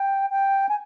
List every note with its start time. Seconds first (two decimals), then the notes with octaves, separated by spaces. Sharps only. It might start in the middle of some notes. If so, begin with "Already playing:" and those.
Already playing: G5
0.31 G5
0.69 G#5